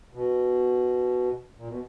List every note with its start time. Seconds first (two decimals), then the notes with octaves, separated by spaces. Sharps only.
0.13 B2
1.57 A#2
1.67 B2